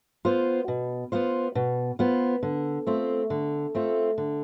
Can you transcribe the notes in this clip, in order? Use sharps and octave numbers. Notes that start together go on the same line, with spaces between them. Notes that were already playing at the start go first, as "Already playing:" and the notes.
B3 F4 C5
B2
B3 F4 C5
B2
B3 F4 C5
D3
A3 C4 F4
D3
A3 C4 F4
D3